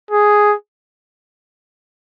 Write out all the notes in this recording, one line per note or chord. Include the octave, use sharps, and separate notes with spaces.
G#4